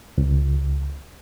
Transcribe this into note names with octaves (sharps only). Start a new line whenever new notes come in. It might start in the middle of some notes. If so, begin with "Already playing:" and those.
C#2